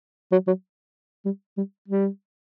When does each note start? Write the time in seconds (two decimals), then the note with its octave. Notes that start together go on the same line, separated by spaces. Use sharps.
0.32 F#3
0.47 F#3
1.25 G3
1.57 G3
1.88 G3